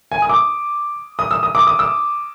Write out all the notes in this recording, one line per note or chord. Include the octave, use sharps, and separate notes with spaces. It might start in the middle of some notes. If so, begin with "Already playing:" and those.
G#5
D#6
D6
D#6
E6
D#6
D6
D#6
E6